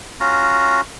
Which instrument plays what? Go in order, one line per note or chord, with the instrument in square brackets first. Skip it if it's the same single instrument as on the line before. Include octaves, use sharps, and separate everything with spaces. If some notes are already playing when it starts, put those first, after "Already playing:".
[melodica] C#4 F4 F#4 A#5